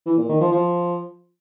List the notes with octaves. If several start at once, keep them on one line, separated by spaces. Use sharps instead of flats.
E3
A#2
D#3
F3
F3